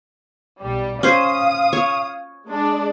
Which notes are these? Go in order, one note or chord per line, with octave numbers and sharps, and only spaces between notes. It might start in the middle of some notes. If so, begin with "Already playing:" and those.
B1 G3
C#4 C5 F5 D#6
C#5
G#3 D4